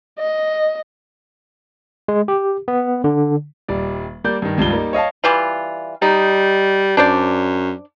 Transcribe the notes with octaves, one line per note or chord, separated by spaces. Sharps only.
D#5
G#3
G4
B3
D3
D#1 G3 D5
G3 A#3 D5 G6
G2 D#3
C#2 G2 F4 G7
G3 A#3 D#4
C#5 D#5 F5 A5
E3 G3 F4
G3 D#4
F#2 D4 C5 D5